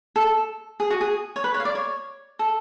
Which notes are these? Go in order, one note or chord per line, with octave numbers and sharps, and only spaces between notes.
A4
G#4
F#4
G#4
C#5
B4
C#5
F5
D5
C#5
A4